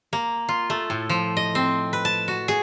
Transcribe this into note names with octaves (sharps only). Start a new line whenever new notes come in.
A#3
F4
A3
A2
F3
D#5
C4
B4
A5
F#4
G#4